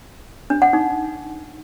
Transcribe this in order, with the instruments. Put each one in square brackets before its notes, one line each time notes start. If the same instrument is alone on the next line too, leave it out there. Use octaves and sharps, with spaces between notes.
[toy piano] D4
F#5
D#4